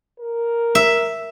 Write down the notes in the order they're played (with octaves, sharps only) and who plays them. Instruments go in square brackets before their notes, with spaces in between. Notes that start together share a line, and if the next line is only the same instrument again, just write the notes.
[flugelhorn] A#4
[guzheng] E5